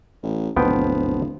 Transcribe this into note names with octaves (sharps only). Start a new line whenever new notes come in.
A1
D1 G#1 D#2 B2 F3 B3 G5